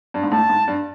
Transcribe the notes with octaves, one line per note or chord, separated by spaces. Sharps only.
G2
G#2
A2 A5
G#2
G2